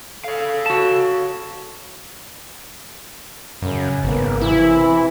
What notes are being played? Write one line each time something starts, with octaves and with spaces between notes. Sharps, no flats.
A4 C#5 F5
F#4 A5
F#2 C#3
G#1 A#3 B3
C3 E3 E4